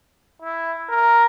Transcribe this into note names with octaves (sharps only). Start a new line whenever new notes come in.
E4
A#4